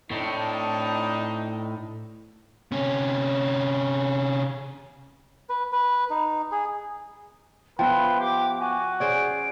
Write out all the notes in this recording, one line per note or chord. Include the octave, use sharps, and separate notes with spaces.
A2 C4 D4 D#4
C3 C#4
B4
B4
D#4
G#4
F3 B3 B4 E5 G5 C6
G4 D6
F#4 G#5
C#4 G#4 C5 D5 D7